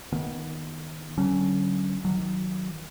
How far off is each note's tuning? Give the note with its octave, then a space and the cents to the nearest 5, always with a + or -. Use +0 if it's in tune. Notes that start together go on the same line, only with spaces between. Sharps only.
D#3 +0 B3 -30
D3 +0 F#3 +40 C#4 +0
D#3 +15 F#3 +0